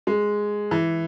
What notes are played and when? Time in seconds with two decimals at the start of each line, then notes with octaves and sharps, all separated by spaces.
0.07 G#3
0.71 E3